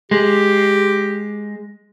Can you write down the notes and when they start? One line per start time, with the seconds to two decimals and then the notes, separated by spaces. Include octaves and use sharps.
0.11 G#3 G4